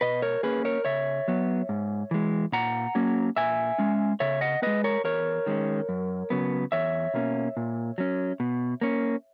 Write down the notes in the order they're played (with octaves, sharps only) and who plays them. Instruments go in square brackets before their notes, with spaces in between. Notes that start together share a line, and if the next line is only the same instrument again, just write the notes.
[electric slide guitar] B2 B4 D#5
A#4 C#5
A#3 C#4 G#4 B4
A#4 C#5
C#3 C#5 E5
F#3 B3
G#2
E3 G#3
A#2 F#5 A#5
F#3 A#3 C#4
A#2 E5 G#5
G#3 C#4
C#3 C#5 E5
D#5 F#5
G#3 B3 B4 D#5
A#4 C#5
E2 A#4 C#5
D#3 G#3 C#4
F#2
C#3 F#3 B3
E2 C#5 E5
B2 A#3 C#4
A#2
F#3 C#4
B2
A#3 C#4